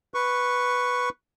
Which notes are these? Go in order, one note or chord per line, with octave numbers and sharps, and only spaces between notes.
B4 C#6